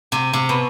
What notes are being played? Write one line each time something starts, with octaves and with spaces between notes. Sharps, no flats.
C3
C3
B2